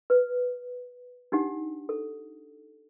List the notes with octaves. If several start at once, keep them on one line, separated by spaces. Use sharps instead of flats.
B4
D4 D#4 G4 F#5
A4